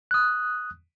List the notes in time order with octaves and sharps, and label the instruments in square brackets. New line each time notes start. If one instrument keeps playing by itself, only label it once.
[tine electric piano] D#6 F#6